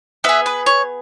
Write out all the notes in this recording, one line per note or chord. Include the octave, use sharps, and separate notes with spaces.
B3 G#4 B4 E5
B4
C#5